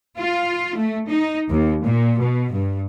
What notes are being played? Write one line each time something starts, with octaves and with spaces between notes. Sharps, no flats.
F4
A3
D#4
D#2
A#2
B2
G2